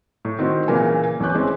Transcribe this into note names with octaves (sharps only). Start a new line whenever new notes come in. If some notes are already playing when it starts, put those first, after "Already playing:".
A2
D#3 C4 F#4
A#2 C#3 E3 A#4 G#5
A1 C#4 D6 F#6 G6
E3 G#3 C4 C#4